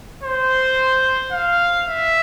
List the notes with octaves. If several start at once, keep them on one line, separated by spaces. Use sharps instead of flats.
C5
F5
E5